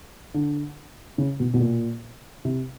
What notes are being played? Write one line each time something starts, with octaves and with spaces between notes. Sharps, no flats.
D3
C#3
B2
B2
A#2
C3